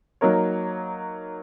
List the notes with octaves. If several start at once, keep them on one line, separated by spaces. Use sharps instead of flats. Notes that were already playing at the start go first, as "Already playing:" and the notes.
F#3 A#3 D#4 A#4 C#5